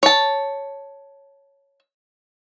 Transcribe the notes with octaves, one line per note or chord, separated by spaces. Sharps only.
C#5 A5